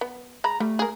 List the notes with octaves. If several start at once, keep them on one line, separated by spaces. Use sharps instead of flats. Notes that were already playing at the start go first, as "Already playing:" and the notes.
B3
G#3 A#5 B5
G3 A3
G#4 A#4